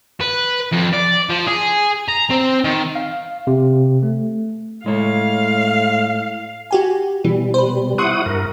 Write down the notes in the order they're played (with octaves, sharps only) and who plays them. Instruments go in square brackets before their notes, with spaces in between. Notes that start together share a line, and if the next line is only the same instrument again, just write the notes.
[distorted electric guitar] B4
F2
D5
F3
G#4
A#5
C4
D#3
[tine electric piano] F5
C3
A3
[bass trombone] A2 [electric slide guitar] G#3 C#5 [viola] F5
[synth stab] F#4 G4 G#5
[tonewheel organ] B2 G3 [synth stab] E3
[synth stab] B4 C5
[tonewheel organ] E4 F#5 D#6 [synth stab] C6 C#6 F#6
[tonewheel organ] G2 A#4